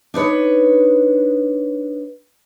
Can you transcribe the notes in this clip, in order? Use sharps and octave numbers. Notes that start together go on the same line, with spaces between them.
D4 D#4 B4 C#5